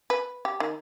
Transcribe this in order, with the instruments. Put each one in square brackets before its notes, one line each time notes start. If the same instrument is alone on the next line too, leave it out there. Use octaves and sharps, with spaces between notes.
[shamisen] B4
G4
D#3